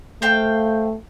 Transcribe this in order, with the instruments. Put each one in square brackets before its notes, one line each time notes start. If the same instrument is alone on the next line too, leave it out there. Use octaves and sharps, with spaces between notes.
[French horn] A3 [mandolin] C5 F5 G5